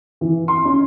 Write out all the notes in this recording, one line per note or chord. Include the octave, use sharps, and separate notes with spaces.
E3
C6
C#4